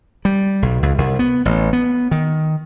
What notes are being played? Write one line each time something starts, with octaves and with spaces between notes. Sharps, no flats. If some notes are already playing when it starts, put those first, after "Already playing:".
G3
B1
C#2
C2
B3
A1
B3
D#3